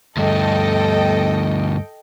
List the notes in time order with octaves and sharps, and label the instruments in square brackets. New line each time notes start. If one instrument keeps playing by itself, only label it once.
[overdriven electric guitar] D2 G2 [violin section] A4 D#5 G5